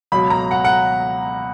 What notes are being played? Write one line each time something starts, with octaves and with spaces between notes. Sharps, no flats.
C#2 B2 F#3 B5
A#5
F#5
F#5